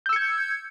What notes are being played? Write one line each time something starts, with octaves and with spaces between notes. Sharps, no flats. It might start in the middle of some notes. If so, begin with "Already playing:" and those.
E6 G6 G#6 C#7